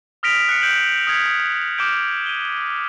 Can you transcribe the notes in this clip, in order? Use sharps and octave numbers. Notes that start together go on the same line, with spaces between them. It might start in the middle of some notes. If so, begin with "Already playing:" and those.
D#6 F6 A#6 B6 D7 F7
F#6 C#7
G6 D7 E7 F#7
D#6 F6 G#6 B6 C#7
D6 F6 G6 D7
D#7 G7